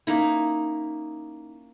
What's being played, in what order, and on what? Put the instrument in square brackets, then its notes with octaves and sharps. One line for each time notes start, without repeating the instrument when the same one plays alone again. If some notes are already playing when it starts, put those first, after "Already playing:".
[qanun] A#3 C#4 D#4 E4